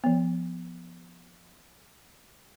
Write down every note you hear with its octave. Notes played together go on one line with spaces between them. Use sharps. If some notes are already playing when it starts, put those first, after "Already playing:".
F3 B3